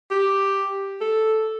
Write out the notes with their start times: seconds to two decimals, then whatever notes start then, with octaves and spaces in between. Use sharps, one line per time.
0.11 G4
1.01 A4